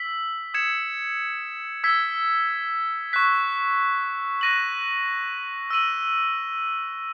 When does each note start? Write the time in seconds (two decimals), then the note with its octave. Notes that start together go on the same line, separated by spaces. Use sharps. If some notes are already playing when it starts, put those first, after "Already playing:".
Already playing: E6 B6 F#7
0.54 D#6 G#6 C#7 E7
1.84 E6 G#6 B6
3.13 C#6 F#6 B6
4.41 F#6 A#6 D#7 F#7
5.70 E6 A#6 D#7 F#7